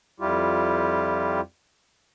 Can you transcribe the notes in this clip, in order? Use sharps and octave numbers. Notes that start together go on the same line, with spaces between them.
F2 G3 E4 F4 G4